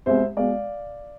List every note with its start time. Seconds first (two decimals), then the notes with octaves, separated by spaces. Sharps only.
0.06 C2 B2 G#3 C5 E5
0.37 B2 G#3 D5 F5